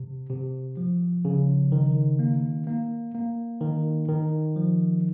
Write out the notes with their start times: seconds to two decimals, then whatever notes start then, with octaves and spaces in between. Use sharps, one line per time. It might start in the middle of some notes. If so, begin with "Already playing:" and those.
Already playing: C3
0.30 C3
0.77 F3
1.25 C#3
1.72 D#3
2.19 A#3
2.67 A#3
3.14 A#3
3.61 D#3
4.08 D#3
4.56 F3